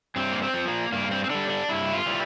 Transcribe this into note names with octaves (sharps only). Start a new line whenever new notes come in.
G2 C4
A#3
C4
F3
A#3
G2 A#3
C4
C4
D3 G3 D4
D4
G2 E4
F4
E3 G3